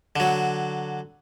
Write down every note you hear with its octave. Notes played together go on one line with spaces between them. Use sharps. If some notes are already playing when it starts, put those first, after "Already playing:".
D3 F#3